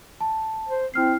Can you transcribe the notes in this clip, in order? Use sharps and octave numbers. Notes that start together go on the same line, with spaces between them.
A5
C5
C4 E4 F6 C7